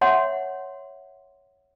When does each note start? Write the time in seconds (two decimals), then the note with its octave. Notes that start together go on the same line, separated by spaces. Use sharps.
0.01 C#5 E5 F#5 C6